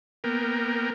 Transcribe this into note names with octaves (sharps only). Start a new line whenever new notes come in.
A#3 B3 A#4 G5